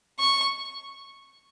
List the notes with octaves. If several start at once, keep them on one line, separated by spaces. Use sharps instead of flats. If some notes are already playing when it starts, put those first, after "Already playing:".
C#6